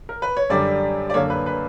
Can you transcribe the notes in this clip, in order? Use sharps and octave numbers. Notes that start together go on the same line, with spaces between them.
A#4
B4
C#5
F#2 D3 G3 D5
D5
F#2 D3 A#3 C#5
B4
B4